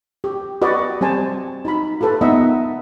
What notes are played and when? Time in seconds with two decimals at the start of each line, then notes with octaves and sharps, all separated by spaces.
0.24 G4
0.62 F#4 G4 B4 D5 D#5
1.01 G3 C4 C5 G#5 A5
1.65 D#4 F#4 B5
2.01 F4 G4 A4 B4
2.21 B3 D#4 D#5 E5 F#5